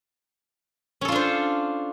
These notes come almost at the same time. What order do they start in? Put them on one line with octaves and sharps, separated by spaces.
C#4 A4 F4 D4 C5